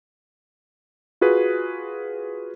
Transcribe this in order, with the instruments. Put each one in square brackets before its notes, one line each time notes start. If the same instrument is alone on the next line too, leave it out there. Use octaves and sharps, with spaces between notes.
[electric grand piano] F4 F#4 G#4 B4